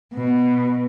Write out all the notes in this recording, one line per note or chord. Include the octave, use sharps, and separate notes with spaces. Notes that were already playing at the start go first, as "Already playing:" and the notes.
B2